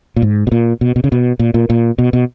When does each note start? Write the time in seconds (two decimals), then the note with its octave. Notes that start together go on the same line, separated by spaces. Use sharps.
0.16 A#2
0.22 G#2
0.47 B2
0.52 A#2
0.81 B2
0.96 B2
1.04 C#3
1.12 B2
1.39 A#2
1.54 A#2
1.70 A#2
1.98 B2
2.13 B2